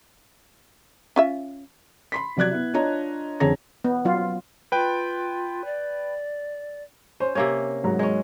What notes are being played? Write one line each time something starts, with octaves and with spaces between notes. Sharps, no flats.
C#4 F4 E5
B5 C6 B6
C3 F#3 D5 F#6 G#6
B3 E4
D4 F4 C#5 D#5 A#5
F2 D3 G#4 C#5 A#5 A#6
B3
F#3 F4
F4 B4 G5
D5
C#4 C5
C3 A#3 C#4 G#6
G#2 F#3 A#5
G#3 C#4